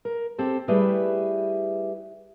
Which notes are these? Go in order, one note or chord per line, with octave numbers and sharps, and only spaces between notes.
A#4
C4 G4 A4
G3 A3 E4 G4 G#4 B4